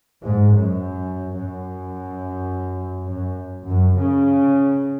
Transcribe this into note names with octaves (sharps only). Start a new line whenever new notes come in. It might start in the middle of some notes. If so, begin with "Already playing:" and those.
G#2
F#2
F#2
F#2
F#2
C#3